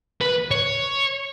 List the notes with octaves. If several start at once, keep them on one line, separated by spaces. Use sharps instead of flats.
B4
C#5